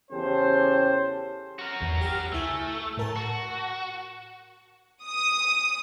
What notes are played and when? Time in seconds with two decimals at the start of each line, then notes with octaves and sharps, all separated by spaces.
0.11 E2 C#3 C#4 G4 A4 C5
1.59 F#4 A#4
1.80 G#1 E2
2.01 G4 F6
2.32 C#2 A3 E4 G#5
2.97 A2 A#4 A5
3.16 F#4
5.06 D#6